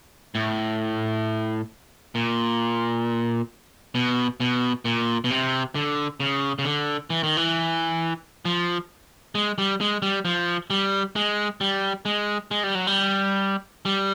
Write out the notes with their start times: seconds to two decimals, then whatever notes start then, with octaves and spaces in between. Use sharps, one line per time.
0.35 A2
2.15 A#2
3.95 B2
4.40 B2
4.85 A#2
5.24 B2
5.30 C3
5.75 D3
6.20 C#3
6.59 C#3
6.65 D3
7.10 E3
7.23 D#3
7.37 E3
8.45 F3
9.35 G#3
9.58 G3
9.81 G#3
10.02 G3
10.25 F3
10.70 G3
11.16 G#3
11.61 G3
12.05 G#3
12.51 G#3
12.63 G3
12.75 F#3
12.87 G3
13.85 G3